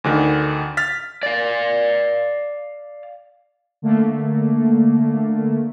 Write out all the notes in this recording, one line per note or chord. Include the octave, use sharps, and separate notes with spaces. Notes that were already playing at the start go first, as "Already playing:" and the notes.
D2 D3 D#3
F6 A6 B6
D5 F5
D3 A3 A#3